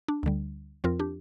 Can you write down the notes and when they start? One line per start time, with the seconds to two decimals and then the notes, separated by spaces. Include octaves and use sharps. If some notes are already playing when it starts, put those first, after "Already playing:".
0.08 D4
0.23 D2 D3 G3
0.84 F2 F3 C4 F4 A#4
1.00 D4 G4